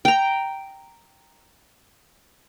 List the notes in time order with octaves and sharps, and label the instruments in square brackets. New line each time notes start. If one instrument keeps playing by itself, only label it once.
[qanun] G5 A#5